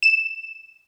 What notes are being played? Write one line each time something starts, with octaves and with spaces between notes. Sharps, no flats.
E7